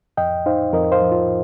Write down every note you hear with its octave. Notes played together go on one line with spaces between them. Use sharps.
F2 D#5 G5
D#4 C5 F5
F2 A#4 D#5
C5 F5
F3
F4